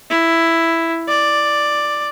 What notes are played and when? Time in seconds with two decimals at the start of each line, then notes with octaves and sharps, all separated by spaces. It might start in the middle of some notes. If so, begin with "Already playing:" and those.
0.11 E4
1.09 D5